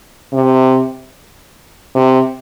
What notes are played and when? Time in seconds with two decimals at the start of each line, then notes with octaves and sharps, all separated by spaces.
0.33 C3
1.95 C3